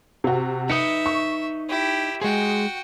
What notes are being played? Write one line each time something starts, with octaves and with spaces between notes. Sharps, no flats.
C3 F#4
D#4 B4 D#5 E5 C#7
C#6
E4 G4
G#3 F#4 G#4 G5